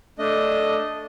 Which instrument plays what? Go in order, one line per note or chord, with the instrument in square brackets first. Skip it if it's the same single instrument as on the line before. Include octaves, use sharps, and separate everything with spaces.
[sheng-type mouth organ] A3 D4 D#5